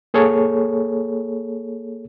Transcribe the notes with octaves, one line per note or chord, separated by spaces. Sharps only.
A#3 G#4 A4 C#5